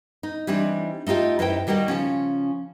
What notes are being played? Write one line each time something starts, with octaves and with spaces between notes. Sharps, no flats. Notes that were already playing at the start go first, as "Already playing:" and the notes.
D#4
E3 G3 C4 D4 D#4
A3 D#4 F4 G4 D#5
F#2 E4 B4 C5 D#5 G5
D#3 G3 A#3 F#4 G4
C#3 F3 C#4